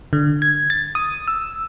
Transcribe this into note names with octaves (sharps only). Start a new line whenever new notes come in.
D3
G#6
A6
D#6
E6